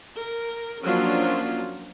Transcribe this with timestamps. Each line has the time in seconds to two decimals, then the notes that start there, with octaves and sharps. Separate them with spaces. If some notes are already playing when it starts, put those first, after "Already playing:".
0.21 A#4
0.82 F3 F#3 A#3 C#4 D4 F4